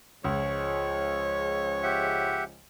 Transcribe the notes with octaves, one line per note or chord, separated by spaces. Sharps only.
C#2 C#3 F3 G#3 C#5
G4 E5 F#5